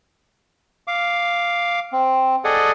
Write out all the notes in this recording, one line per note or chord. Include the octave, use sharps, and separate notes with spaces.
F5 D6
C4
G#4 A4 D5 D#5 F#5 G#5